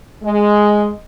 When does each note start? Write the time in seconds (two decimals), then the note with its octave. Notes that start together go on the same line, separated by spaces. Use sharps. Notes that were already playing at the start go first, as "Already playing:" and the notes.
0.24 G#3